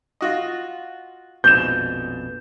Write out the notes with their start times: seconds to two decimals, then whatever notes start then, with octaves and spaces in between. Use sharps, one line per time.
0.21 F4 F#4 D#5
1.44 A#1 F2 G#2 B2 G6 E7